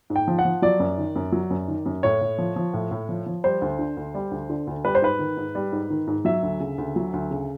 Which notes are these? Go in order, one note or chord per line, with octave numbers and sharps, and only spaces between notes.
G#2
G5
F3
F#5
F3
F#3 D5
F#2
D#3
F#2
F#3
F#2
D#3
F#2
A2 C#5
A2
F3
F3
A2
A2
F3
F3
G3 C5
D2
D3
D2
G3
D2
D3
D2
G3 B4
C5
G#2 B4
D#3
G#2
G3
G#2
D#3
G#2
F#3 E5
D2
C#3
D2
F#3
D2
C#3